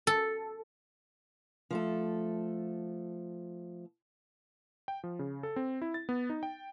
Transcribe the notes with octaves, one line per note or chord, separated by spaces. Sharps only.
A4
F3 A3 A4
G5
F3
C#3
A4
C4
E4
A6
B3
D#4
G5